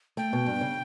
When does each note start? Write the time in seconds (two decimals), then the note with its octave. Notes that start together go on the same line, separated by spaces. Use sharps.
0.17 A3 G5
0.33 B2
0.47 G2
0.61 C#3